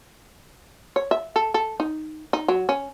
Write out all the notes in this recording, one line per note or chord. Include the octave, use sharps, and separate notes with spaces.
C#5
E5
A4
A4
D#4
D#4
F#3
C#4